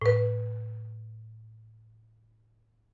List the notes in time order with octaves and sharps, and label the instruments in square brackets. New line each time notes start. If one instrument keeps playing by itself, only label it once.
[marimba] A2 B4